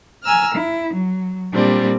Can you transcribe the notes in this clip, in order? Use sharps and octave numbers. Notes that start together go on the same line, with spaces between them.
G#5 A#5 E6 F6
E4
F#3
A#2 G3 C4 D4